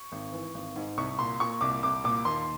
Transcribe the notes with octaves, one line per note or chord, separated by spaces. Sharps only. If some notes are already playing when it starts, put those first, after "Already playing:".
Already playing: C#6
G#1
E3
G#1
G#2
C2 C#6
A#2 C6
A#2 C#6
C2 D6
C2 D6
A#2 D6
D#2 C6